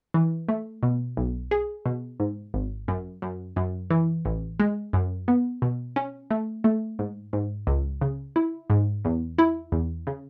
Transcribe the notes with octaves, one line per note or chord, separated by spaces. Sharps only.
E3
A3
B2
B1
G#4
B2
G#2
G#1
F#2
F#2
F#2
E3
A1
G#3
F#2
B3
B2
C#4
A3
A3
G#2
G#2
C#2
C#3
E4
G#2
E2
E4
E2
C#3